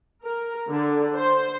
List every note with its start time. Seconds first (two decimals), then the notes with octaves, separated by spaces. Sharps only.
0.23 A#4
0.71 D3
1.15 C5